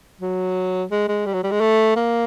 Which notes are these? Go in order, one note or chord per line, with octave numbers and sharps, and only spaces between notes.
F#3
G#3
G#3
G3
F#3
G3
G#3
A3
A#3